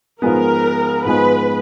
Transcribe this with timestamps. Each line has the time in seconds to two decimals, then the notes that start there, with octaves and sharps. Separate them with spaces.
0.22 G#2 F3 G#3 B3 A#4
1.05 G#2 F3 G#3 B3 B4